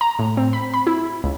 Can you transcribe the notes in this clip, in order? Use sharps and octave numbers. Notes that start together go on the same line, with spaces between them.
A#5
A2
C4
B5
B5
E4
C#2